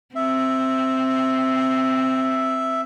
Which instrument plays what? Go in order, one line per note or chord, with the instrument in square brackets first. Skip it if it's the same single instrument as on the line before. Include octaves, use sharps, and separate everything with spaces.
[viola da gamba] C4 [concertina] E5